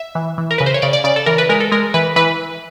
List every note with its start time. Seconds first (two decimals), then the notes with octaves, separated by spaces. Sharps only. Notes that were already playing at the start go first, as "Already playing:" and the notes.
Already playing: E5
0.15 E3
0.38 E3
0.51 A#4
0.58 C#3 B4
0.66 C5
0.74 C#5
0.82 C#3 D5
0.93 D5
1.04 C#3 D5
1.16 A4
1.26 E3 A#4
1.38 B4
1.49 G#3 A#4
1.60 A4
1.72 G#3 A#4
1.94 E3 B4
2.16 E3 B4